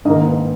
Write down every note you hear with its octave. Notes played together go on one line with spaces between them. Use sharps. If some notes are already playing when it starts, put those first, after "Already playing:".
G#2 D#3 A#3 D#5
B4